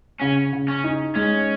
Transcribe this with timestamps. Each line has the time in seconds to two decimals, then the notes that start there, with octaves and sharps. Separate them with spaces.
0.21 C#3 C#4
0.53 C#3
0.68 C#4
0.84 D#4
1.15 G#3 C#4